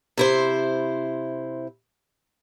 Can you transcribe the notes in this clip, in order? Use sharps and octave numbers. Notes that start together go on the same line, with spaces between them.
C3 E4 C5